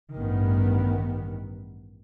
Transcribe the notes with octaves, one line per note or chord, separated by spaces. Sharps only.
A1 G2 D#3 B3